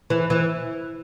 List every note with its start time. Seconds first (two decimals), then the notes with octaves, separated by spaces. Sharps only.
0.10 E3
0.30 E3